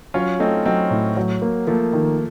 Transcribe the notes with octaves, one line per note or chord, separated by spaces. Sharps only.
F#3 C#4 F4
A3 C4 D#4
F#3 C4 D#4
A2
F#3
A#3
F3 A3 A#3
D#3